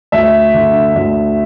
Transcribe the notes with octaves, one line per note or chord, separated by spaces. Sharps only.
D2 E5
D3
D2